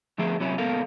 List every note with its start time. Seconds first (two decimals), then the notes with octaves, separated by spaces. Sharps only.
0.18 D2 F3 A3 B3 G#4 E5
0.40 C3 F#3 C#4 E4
0.58 C#2 A#2 B3 A4 A#4 F5